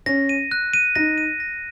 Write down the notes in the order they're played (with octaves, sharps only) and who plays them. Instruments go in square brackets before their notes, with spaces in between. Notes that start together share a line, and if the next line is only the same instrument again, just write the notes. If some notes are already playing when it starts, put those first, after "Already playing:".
[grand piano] C#4 [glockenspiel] A#6
[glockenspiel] D#7
F#6
D#7
[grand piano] D#4 [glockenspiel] A#6
[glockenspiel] D#7
A#6